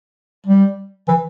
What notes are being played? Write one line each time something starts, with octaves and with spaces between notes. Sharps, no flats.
G3
E3